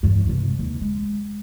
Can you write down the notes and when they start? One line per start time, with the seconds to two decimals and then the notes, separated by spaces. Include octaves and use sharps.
0.03 E2 G2
0.27 G2 C3
0.59 D#2
0.81 G#3